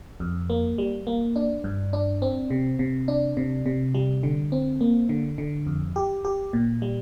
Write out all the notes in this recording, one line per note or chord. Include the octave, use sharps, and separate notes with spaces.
F2
A#3
G3
A#3
D4
G2
D4
C4
C3
C3
D4
C3
C3
G3
D3
C4
A#3
D3
D3
F2
G4
G4
A#2
G3